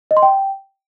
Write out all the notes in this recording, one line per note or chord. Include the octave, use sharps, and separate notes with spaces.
D#5
C6
G5